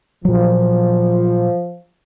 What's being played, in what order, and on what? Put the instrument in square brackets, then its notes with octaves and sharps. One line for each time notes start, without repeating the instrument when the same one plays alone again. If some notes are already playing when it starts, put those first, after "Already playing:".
[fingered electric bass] A#2 F#3 [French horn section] F3